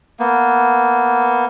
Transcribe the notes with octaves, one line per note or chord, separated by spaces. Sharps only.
A#3 B3